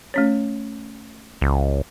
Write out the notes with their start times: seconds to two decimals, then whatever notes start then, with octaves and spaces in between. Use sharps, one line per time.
0.14 A3 C#4 C#5
1.41 C#2